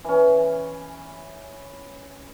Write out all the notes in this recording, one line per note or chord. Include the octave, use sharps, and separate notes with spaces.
E3 C#4